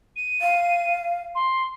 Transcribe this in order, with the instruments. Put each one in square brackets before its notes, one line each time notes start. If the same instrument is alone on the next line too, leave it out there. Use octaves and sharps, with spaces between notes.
[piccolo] D#7
[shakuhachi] F5
[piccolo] C6